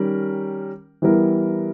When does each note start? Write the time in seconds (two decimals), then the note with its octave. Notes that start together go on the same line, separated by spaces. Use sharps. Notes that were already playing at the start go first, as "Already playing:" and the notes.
Already playing: D#3 G3 C#4 A#4
1.02 E3 G3 B3 E4 A#4